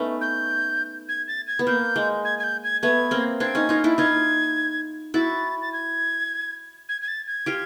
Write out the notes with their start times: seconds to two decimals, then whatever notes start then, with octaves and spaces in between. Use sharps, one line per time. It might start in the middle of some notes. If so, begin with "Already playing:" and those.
Already playing: A3 B3 C#4 D#4
0.21 G6
1.09 G#6
1.28 A6
1.47 G#6
1.59 B3
1.67 A#3 G6
1.96 G#3
2.25 G#6
2.39 G#6
2.43 G6
2.64 G#6
2.83 A3 B3 G#6
3.11 A#3 C4
3.40 C4 D4 G#6
3.55 C#4 D#4
3.69 D#4 F4
3.84 D4 E4
3.98 D#4 F4 G#6
5.14 E4 F#4 A6
5.61 A6
5.73 G#6
6.89 G#6
7.01 G#6
7.08 A6
7.27 G#6
7.46 F4 G4